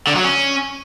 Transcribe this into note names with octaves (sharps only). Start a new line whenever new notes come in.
D3
F#3
C#4